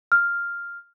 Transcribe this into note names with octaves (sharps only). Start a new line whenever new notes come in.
F6